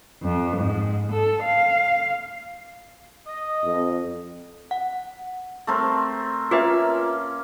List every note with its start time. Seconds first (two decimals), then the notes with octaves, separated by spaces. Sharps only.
0.22 F2
0.56 G#2
1.11 A4
1.42 F5
3.27 D#5
3.65 F2
4.71 F#5
5.67 A3 C4 A#4
6.51 A#3 C#4 F4 B4 E5